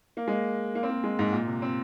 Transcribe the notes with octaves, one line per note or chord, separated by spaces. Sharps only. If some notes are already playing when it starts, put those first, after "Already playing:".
A#3
G#3
A#3
A#3
C4
A#3
G#3
G#2
A#2
C3
C4